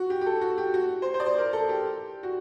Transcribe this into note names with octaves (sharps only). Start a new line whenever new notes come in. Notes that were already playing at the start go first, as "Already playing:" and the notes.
Already playing: F#4
G4
G4
A4
F#4
G4
F#4
C5
C5
D5
C5
A#4
A4
G4
F#4